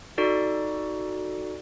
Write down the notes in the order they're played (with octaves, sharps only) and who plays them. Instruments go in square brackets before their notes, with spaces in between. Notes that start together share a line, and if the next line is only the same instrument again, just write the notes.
[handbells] D#4 F#4 A4 D5